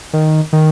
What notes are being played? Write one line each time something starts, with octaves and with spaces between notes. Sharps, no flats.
D#3
D#3